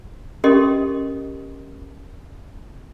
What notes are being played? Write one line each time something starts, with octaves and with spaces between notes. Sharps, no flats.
C#4 G4 A4 A#4 D#5 C6